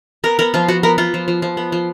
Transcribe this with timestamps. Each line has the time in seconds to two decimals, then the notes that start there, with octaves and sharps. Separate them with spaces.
0.24 B3 A#4
0.39 B3 A#4
0.54 F3 F4
0.68 F3 F#4
0.83 B3 A#4
0.98 B3 F4
1.14 F3
1.28 F3
1.42 F3
1.57 B3
1.72 F3